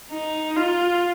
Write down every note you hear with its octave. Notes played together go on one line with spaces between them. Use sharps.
D#4
F4